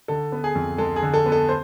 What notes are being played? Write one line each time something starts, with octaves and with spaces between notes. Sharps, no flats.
D3 A4
B3
G#4
F2
G#3 A4
G#4
D3
A4
B3
A4
C5